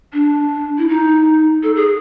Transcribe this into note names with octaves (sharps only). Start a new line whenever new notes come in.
D4
E4
D#4
A4
G#4